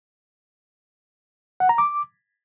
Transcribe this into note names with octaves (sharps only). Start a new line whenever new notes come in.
F#5
A#5
D6